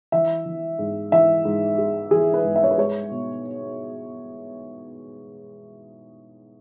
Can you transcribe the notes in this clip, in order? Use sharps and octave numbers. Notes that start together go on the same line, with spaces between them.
E3 E5
E3
G#2
E3 E5
G#2
G#3
E3 G#4
B4
G#2
E5
C#5
B4
G#3 C#5
B2